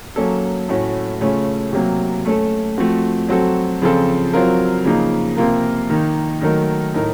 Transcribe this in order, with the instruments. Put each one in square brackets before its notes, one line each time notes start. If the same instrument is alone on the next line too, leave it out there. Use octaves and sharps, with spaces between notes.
[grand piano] F#3 A#3 C#4 A4
A2 A3 C#4 F#4
C#3 A3 C#4 F4
C3 F#3 A#3
A3 C#4 A4
F3 A3 C4 F#4
F#3 C4 F#4 A4
C#3 F3 C4 F4 A4
F#3 C4 F4 A#4
C#3 F3 A#3 D#4
C3 F3 A#3 F4 A#4
D#3 A#3 D#4
D#3 F#3 A3 D#4 A#4
A2 A3 D#4 A#4